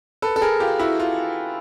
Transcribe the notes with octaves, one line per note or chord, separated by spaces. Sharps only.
A4 B4
A4
G#4 A#4
F4 G4
E4 F#4
F4